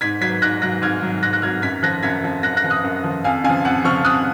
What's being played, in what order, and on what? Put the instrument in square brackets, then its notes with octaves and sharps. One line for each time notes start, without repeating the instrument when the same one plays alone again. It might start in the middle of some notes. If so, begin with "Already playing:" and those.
[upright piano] G#2 G#6 B6
F#3 G#6 B6
G#2 F#6 A#6
F#3 F#6 A#6
G#2 F6 G#6
F#3
G#2 F#6 A#6
F#6 A#6
F#3 F6 G#6
F#2 G#6 B6
F3 F#6 A#6
F#2 G#6 B6
F3
F#2 F#6 A#6
F#6 A#6
F3
D#6 F#6
F#2
F3
F2 F5 G#5
C#3 F5 G#5
F3
F2 F#5
C#3 F3 C#6 F6
F2 D#6 F#6